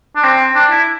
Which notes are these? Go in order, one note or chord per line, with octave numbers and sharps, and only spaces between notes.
D4
C4
D4
E4